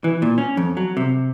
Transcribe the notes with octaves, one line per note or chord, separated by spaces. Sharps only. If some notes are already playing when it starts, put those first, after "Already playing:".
E3
A#2
C#4
F2
F#3
C3